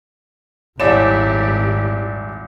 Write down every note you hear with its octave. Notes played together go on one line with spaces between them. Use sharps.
D#1 G#1 E4 G4 C#5 D5 F#5 E7